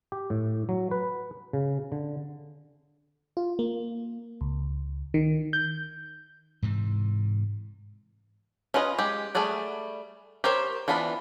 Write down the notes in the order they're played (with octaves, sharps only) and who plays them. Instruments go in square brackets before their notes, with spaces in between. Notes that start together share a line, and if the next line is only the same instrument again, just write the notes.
[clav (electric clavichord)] G4
A2
F#3
B4
C#3
D3
[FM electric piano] F4
A#3
C#2
D#3
G6
[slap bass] G#2 C3 E3
[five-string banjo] C#4 F4 B4 C5 D#5
G#3 G4
G3 A3 G#4 D5 F#5
G4 A#4 C5 C#5
E3 B3 D4 F4 B5